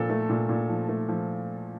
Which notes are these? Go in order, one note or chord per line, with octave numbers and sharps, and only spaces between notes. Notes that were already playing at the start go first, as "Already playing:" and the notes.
Already playing: A#2 F3 A4
A3
A#2
A#2
F3
A3
F3